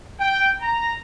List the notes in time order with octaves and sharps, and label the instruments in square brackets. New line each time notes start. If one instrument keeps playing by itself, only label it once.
[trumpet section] G5
A#5